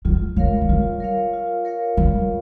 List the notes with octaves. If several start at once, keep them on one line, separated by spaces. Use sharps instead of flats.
F#3 F4
G3 A#4 C#5 F5
G#3
G3 F4
A#4 C#5 F5
F4
A#4 C#5 F5
G3 F4